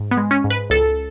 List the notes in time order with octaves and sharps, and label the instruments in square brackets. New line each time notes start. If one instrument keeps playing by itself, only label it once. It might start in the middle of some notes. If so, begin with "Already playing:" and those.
Already playing: [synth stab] G#2
B3
G#3
C#4
G#2
B4
C#2 A4